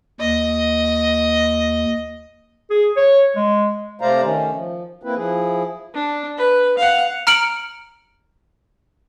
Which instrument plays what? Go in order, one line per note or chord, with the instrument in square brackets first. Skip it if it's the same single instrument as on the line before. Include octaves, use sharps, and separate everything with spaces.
[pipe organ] D#2 [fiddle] D#5
[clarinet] G#4
C#5
G#3
[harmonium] C3 A3 C5 D5 F5 A#5
D#3 A3 C#4
F3
A#3 C4 E4 B4
F3 E4 G#4
[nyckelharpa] D4
B4
F5 F#5
[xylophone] A#5 F6 C#7 D7 F#7